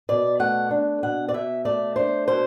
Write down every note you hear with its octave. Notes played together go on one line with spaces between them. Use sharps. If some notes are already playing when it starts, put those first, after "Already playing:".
B2 D5
A3 F#5
D4
B2 F#5
D5
B2 E5
A3 D5
D4 C5
B2 C5